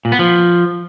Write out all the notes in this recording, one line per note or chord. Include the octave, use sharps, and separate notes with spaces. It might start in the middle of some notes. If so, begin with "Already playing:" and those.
A#2
B3
F3